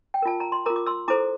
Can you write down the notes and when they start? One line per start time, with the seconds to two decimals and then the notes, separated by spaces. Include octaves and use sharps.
0.14 G5
0.22 F4 A#4 A5
0.40 A#5
0.52 C6
0.66 A#4 A#5 D6
0.70 F4
0.76 D6
0.86 C6 E6
1.08 E4 A4 C5 A#5 D6